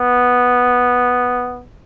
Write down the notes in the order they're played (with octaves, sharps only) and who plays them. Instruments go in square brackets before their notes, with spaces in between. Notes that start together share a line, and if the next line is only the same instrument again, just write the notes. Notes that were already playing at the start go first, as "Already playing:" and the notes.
Already playing: [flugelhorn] B3